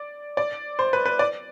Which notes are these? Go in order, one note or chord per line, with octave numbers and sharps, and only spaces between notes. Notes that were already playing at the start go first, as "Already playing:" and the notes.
Already playing: D5
D5
C5
B4
B4
D5